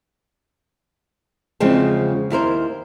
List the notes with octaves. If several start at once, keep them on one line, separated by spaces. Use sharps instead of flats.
E2 C#3 F3 G#3 C4
D#2 E4 A#4 C5